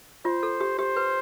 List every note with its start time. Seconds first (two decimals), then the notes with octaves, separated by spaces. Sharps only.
0.25 F4 C5
0.43 A4
0.60 G4
0.79 G4 C5
0.96 B4